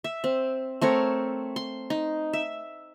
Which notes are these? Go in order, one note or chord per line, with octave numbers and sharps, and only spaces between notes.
E5
C4
A3 C4 A#4 C#5
C6
D#4
E5